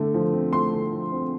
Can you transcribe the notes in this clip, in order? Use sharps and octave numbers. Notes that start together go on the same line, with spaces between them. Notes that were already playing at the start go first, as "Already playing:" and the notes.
Already playing: D3 A3
F3
C4
A3 C6
D3
F3
C4